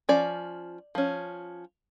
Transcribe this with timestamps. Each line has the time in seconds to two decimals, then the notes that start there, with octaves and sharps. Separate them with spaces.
0.09 F3 C#4 D5
0.95 F3 C#4